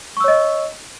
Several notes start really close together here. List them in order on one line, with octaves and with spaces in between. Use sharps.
C#6 E6 C#5 D#5